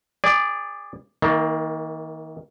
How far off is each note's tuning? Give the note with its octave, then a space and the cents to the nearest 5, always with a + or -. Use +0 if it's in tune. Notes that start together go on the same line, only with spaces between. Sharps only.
G#4 -30 D5 +0
D#3 +35 A#3 +0